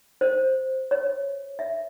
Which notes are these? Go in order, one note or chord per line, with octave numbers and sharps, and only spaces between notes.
C5
C#5
E5